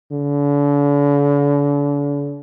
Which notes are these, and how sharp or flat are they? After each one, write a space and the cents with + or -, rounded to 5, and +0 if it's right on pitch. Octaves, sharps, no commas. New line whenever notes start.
D3 -40